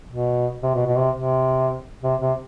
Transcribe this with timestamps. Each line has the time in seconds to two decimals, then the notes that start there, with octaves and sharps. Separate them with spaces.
0.10 B2
0.63 C3
0.75 B2
0.86 B2
0.98 C3
1.16 C3
2.03 C3
2.21 C3